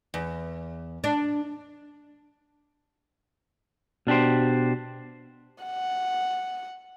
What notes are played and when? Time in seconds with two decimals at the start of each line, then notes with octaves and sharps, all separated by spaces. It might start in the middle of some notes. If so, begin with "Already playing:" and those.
0.14 E2
1.04 D4
4.07 B2 D4 G4 C5
5.64 F#5